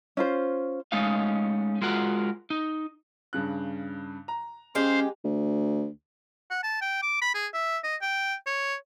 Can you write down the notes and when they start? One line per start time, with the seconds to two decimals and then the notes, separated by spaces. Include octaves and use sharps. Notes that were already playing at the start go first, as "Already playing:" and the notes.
0.17 C#4 F4 C5
0.92 G#3 A3 C#4 D#4 F5
1.82 G#3 F4 F#4 A#4 F#5
2.50 D#4
3.33 G2 C#3 F#6
4.28 A#5
4.75 G#3 C#4 G4 C5 F5
5.24 D2
6.51 F#5
6.63 A5
6.81 G5
7.02 D6
7.22 B5
7.34 G#4
7.54 E5
7.84 D#5
8.01 G5
8.46 C#5